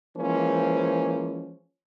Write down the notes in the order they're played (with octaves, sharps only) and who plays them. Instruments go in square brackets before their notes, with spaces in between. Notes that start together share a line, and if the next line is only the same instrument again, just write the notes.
[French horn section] E3 F3 G#3 A#3 C#4 C5